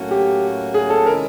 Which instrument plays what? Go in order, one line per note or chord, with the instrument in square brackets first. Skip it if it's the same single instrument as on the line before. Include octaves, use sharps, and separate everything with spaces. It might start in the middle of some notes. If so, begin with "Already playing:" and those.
Already playing: [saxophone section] A2 F#3 A#3 C#4 F#4
[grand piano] G4
G#4
A4
[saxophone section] C3 D#3 G#3 C#4 E4 [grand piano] A#4